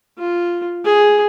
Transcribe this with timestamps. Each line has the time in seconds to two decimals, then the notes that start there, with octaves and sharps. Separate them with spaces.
0.18 F4
0.85 G#4